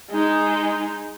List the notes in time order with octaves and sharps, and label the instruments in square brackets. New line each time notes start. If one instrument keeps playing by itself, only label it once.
[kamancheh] G#3 D#4